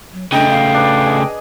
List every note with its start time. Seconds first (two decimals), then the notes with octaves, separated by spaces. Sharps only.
0.13 F#3
0.32 C#3 A3 D4 D#5 G5 A#5
0.50 F5
0.74 D4 B4
1.06 G#4 D#5